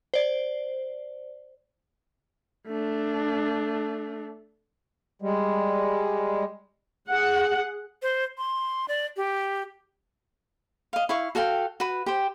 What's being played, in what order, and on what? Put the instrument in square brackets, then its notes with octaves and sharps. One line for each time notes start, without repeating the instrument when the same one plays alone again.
[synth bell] C5 D5
[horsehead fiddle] A3 D4
[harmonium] G3 G#3
[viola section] G#4 F#5
[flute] C5
C6
D5
G4
[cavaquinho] D#5 F5
E4 F5 C#6
F#4 A4 F5 G5
F#4 B4
G4 C5